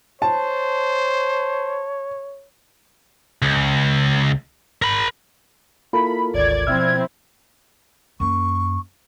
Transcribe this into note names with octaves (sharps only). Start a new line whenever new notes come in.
C5 C#5 A5
C#2
A#4 B5
A#3 E4 F4 A4 A#4 B5
G#1 D2 D5 G#6
B2 F3 C4 E4 E5 E6 F6
F#2 A#3 C#6